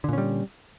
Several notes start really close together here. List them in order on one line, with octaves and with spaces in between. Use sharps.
D3 A#2 C#4 G3